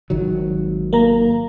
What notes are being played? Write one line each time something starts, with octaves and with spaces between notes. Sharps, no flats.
G#1 D#3 F#3
A#3 A#5